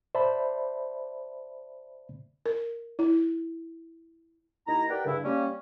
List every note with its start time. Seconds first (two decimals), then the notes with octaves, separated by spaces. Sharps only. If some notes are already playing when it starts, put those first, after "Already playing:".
0.15 C5 D5 E5 A5 B5
2.46 A#4
2.99 E4
4.68 D#2 D#4 E4 A#5
4.90 G4 A#4 B4 D5 F#5 G5
5.06 G2 C#3 E4
5.24 G3 A#3 C#4